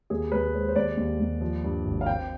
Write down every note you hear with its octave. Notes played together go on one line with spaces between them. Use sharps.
D#2 G#4
D#2 B4
G#3 C5
C5
D#2 D5
D#2
D#2
F3
G2
G#1
F5
C4 G5